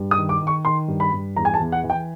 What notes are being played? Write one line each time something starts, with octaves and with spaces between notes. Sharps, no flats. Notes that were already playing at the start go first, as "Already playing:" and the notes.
Already playing: G2
D#6
D#3
D6
D#3
C#6
D#3 C6
G2
B5
G2
E2 A#5
G#5
A5
E2
F#5
E3
G5